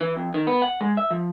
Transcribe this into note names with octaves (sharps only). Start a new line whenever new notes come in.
E3
F2
D#3
B3
F#5
G#3
E5
F3